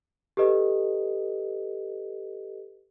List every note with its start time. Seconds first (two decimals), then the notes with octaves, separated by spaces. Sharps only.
0.37 G4 A4 B4 D#5